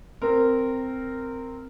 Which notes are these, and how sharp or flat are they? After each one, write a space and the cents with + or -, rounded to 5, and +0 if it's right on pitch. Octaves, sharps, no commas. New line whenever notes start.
C4 -5 A#4 -15